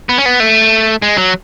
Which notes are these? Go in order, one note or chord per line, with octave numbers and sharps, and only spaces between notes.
B3
C#4
B3
A3
G#3
F#3